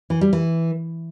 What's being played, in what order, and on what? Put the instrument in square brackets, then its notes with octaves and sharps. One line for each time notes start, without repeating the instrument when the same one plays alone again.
[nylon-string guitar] E3
G3
E3